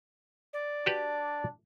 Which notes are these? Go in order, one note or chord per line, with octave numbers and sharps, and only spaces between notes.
D5
D4 F#4 G4 B4